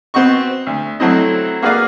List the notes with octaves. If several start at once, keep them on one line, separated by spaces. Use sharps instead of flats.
B3 C4 F#4 D#5 C#6
D2
F#3 A3 C4 E4 D#5
A#3 F#4 G#4 B4 D5 F5